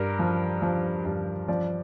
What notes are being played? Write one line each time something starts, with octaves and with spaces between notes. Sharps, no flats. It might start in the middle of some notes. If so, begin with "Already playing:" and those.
Already playing: G2 A#4
F3
F3
G2
F3 D5